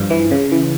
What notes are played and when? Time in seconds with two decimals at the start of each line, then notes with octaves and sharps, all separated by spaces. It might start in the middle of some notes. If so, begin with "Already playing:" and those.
Already playing: G2 F3
0.10 E3
0.31 C#3
0.52 E3